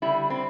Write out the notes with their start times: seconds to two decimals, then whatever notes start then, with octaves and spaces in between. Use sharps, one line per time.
0.02 D3 G3 E4
0.30 C4